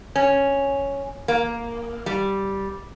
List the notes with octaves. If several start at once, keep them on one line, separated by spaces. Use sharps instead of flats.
C#4
A#3
G3